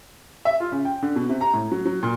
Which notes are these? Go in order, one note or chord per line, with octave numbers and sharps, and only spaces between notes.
E5
F4
C#3
G5
D3
B2
C3
A#5
A2
F#3
F#3
A#2